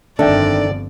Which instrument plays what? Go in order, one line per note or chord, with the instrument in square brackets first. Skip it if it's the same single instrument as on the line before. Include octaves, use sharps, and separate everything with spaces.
[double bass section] G1 F2 [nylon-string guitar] D#3 D4 [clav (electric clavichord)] A4 E5 G5 [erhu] D5